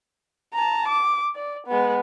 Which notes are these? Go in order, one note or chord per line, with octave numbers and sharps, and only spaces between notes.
A5 A#5
D6
D5
G#3 B3